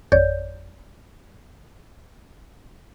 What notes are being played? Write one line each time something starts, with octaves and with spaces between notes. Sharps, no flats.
G#1 F2 C#5 D5 G6